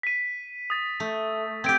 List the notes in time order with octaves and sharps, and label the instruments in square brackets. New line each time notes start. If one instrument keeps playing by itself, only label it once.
[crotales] B6 D#7
D#6 A6
[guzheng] A3
[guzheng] C4 G4 [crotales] G#6 D7